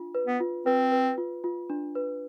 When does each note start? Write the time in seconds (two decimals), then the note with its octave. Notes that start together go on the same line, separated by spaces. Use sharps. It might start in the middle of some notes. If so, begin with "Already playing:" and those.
Already playing: D4 F4
0.15 B4
0.27 B3
0.40 F4
0.66 C4 B4
0.92 B4
1.18 F4
1.44 F4
1.70 D4
1.95 B4